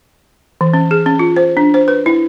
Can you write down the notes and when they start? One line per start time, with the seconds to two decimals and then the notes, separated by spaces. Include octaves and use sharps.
0.61 E3
0.74 C#4
0.91 G#4
1.06 C#4
1.19 F4
1.36 C5
1.57 D4
1.74 C5
1.88 B4
2.06 E4